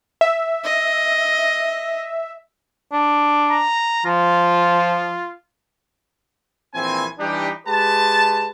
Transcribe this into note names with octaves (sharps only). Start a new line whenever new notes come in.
E5
D#5
D4
A#5
F3 F4
A#1 E3 C4 G#5
E3 G3 D4 D#4 G4
G#3 G4 B4 A5